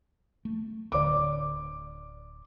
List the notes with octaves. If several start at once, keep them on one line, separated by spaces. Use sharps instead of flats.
A3
D1 D3 D5 D6